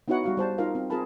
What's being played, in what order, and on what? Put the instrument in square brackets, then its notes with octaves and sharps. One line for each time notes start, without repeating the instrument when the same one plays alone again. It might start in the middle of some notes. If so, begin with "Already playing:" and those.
[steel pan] B3 D#4 E4 F#4 C#5 F#5
G3 F#4 F5
G3 C5 A5
D#4 F4 A#4 F5
C4
C4 F4 G#4 A#4 A5 B5